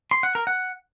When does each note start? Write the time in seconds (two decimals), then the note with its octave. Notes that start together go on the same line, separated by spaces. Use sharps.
0.11 C6
0.23 F#5
0.35 A#4
0.47 F#5